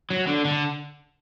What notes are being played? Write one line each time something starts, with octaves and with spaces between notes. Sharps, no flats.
F#3
D3
D3